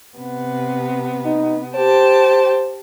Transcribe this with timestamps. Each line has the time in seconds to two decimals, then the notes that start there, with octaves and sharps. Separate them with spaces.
0.18 C3 B3
1.25 D#4
1.75 G4 C5 G5 A5